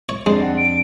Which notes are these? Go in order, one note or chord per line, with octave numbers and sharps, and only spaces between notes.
C#5
F2 G#3 C4 D4
F#5
D7